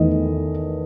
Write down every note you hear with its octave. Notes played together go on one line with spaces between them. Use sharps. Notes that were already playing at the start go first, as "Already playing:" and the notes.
Already playing: E2 D#3 A3 D#5